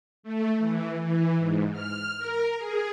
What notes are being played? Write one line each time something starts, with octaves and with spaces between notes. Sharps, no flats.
A3
E3
E3
G#2
F6
A#4
G#4